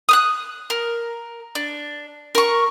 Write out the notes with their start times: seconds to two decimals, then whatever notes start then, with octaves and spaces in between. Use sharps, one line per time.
0.09 D#6 F6 F#6
0.70 A#4
1.55 D4
2.35 A#4 C#6